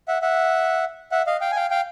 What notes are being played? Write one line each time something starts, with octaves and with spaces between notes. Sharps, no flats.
E5 F#5
E5 F#5
E5 F#5
D#5 F5
F5 G5
G#5
F5 G5
F5 G5